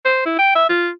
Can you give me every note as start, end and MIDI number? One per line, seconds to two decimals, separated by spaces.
0.05 0.22 72
0.26 0.35 64
0.39 0.51 79
0.55 0.65 76
0.69 0.91 65